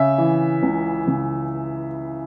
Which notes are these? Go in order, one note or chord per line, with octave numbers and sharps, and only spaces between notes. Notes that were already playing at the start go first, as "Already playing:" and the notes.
Already playing: C#3 E5
E3
C#2
C#2